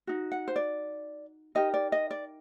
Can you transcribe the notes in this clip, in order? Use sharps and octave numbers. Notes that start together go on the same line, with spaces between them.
D#4 F#4
F#5
C5
D5
D#4 G4 A#4 D#5
D5
D#5
D5